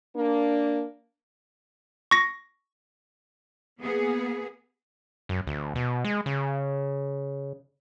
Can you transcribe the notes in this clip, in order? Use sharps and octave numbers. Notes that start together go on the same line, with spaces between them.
A#3 D4
C#6 A#6
A#3 B3 G#4
F#2
D2
B2
G#3
C#3